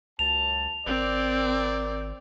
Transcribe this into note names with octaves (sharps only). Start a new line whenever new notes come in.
C#2 F#2 A5 F7
G#1 C4 A#4 D5